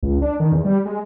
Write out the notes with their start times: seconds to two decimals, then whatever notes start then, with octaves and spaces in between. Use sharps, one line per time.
0.03 C#2
0.22 D4
0.40 D#3
0.52 E2
0.65 G3
0.85 G#3